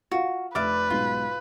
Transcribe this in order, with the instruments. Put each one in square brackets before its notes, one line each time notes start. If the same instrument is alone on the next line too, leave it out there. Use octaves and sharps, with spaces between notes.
[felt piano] F4 F5 [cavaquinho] F#4
[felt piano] F1 F6 A6 [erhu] B4 [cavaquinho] D5 E5 D6
[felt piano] B1 G#2 B2 [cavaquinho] F4